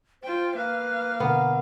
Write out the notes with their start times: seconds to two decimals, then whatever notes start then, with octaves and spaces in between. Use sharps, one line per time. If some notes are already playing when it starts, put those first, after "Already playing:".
0.23 F4 C5 G5
0.56 A#3 B4 F5
1.20 B2 D3 B3 A#4